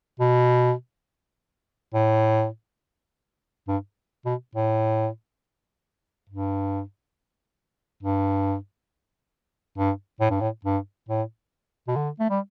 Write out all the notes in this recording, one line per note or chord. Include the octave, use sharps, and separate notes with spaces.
B2
A2
G2
B2
A2
G2
G2
G2
A2
G2
A2
G2
A2
B2
D3
A3
G3